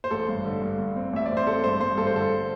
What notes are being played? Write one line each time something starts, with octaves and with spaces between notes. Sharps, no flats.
C5
A1 A4
G2
D3
G2
G2
C4
A1 E5
C4 D5
C5
C4 A4
G2 C5
G2 C5
G2 A4
C5
D3 A4